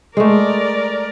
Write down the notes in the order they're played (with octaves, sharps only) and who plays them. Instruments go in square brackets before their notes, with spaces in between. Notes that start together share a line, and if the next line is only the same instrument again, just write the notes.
[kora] G#3 A3 [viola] A#4 D5